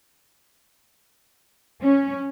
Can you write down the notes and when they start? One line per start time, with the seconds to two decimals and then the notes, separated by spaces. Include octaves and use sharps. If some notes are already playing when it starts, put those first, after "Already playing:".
1.81 C#4